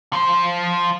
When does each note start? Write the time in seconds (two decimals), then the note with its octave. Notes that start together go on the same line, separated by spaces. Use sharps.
0.13 F3 C5